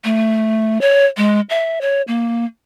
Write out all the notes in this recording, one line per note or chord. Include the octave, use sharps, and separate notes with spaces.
A3
C#5
G#3
E5
C#5
A#3